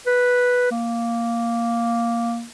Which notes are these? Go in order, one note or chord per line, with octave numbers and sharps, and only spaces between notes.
B4
A#3